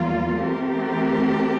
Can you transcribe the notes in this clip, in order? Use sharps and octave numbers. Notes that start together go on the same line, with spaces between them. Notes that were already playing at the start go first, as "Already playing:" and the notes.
Already playing: E2 E3 G3 A#3 F4
E3 A3 C4 G4 A#4